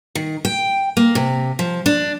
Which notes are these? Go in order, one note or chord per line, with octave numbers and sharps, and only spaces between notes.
D#3
G5
A#3
C3
F3
D4